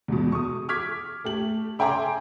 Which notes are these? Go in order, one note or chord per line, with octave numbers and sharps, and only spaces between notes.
E2 G#2 B2
C#6 D#6
C#6 D6 F6 G#6 B6
A3 G4 F#7
E5 G5 G#5 A#5 C6 D6